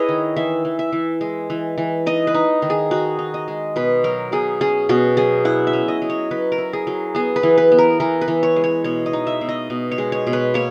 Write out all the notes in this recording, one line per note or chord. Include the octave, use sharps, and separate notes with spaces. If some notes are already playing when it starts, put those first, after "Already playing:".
Already playing: E4 G#4 B4 C#5 D#5
D#3
E3 E5
E3
E5
E3
G#3
E3
E3
D#4 D#5
B4
D#4
D#3
G#4
D#4 F#4
D#4
D#5
G#3
B2 B4
F#3 A#4
B2 G#4
C#4 G#4
B2 F#4
F#3 G#4
E4 F#5
E5
C#4
D#5
F#3
C#5
F#3 B4
A#4
E4
G#4
F#3
B3 G#4
B4
E3
B4
B3
A#4
E3 A#4
B4
E3
C#5
G#3
C#5
B2 C#5
D#5
D#4
E5
B2
D#5
B2
C#5
G#3
C#5
B2
B4
A#3 C#5